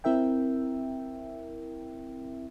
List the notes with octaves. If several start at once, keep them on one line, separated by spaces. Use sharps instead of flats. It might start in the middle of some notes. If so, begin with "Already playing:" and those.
C4 E4 A#4 E5 G5